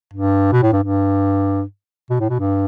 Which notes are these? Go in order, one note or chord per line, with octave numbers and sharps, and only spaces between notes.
G2
B2
A2
G2
G2
B2
A2
B2
G2